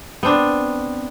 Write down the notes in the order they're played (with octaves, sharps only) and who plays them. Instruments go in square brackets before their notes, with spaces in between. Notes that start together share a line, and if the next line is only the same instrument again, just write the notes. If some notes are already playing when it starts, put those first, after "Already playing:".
[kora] B3 C4 D4